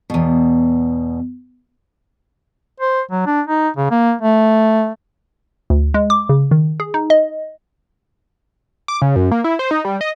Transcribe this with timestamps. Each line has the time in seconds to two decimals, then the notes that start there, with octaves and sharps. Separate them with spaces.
0.10 E2 B2
2.80 C5
3.11 F#3
3.26 D4
3.47 D#4
3.77 C#3
3.91 A#3
4.22 A3
5.70 D2
5.94 G#3
6.10 D6
6.29 C#3
6.51 D#3
6.80 G#4
6.94 D#4
7.10 D#5
8.88 D6
9.02 C#3
9.16 F#2
9.31 A#3
9.44 E4
9.59 C5
9.71 D#4
9.85 G3
10.01 D#5